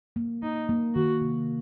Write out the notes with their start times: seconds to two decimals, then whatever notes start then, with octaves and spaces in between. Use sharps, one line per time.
0.16 A#3
0.43 A#3 D#4
0.69 A#3
0.95 D#3 F#4
1.21 C3